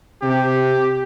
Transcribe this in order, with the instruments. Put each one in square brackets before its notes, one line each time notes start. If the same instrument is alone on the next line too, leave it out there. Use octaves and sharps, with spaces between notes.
[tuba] C3 [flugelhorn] G4